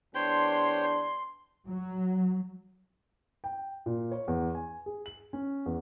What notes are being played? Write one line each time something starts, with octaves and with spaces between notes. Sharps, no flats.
E2 D4 C5 C#5 G5 C6
F#3
G5
A#2
C#5
E2
G#5
G#4
F#7
C#4
E2